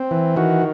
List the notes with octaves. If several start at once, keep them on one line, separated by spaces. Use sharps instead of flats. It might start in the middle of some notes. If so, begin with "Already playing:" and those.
Already playing: C4
E3
D#3 F#4